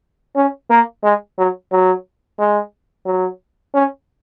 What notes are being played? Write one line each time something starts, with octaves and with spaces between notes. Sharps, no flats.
C#4
A#3
G#3
F#3
F#3
G#3
F#3
C#4